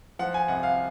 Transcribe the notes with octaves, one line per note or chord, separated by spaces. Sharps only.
F3 F#5
G#5
C2 F#5
F5